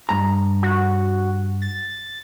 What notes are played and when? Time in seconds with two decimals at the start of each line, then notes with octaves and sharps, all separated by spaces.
0.09 G2 A#5
0.63 F#4
1.62 A6